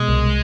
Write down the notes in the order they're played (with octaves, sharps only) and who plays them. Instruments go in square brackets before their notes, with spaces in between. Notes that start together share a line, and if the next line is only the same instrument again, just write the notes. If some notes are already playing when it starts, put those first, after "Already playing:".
Already playing: [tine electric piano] B2 [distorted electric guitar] G#3
[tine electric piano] C2